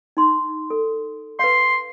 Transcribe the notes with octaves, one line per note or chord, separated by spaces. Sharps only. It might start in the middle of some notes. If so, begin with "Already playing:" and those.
D#4 C6
A4
B4 F5 C6